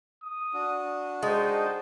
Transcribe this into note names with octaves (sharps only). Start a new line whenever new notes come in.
D#6
D4 F#4
G#3 D#4 C5 G5 A5